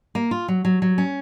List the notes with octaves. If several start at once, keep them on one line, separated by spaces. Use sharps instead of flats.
A#3
F4
F#3
F#3
F#3
C#4